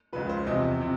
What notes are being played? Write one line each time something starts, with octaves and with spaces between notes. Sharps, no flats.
C#2 C#3 F3 B4
C5
E2 C3 F3 D#5
C3